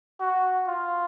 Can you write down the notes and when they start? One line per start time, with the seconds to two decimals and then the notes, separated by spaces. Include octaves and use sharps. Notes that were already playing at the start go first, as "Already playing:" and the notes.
0.20 F#4
0.68 F4